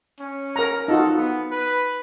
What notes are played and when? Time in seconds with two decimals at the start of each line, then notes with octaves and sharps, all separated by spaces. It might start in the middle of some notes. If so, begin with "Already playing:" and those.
0.20 C#4
0.56 A#4 A#5
0.88 D#4 F4 F#4 A4
1.17 B3
1.51 B4